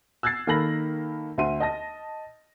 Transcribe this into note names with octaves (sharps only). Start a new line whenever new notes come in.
E6 F#6 G#6 A6 C7
D#3 A#3 A4 B5 A#6 F#7
D2 E5 C6 D#7
D#5 A5 A#6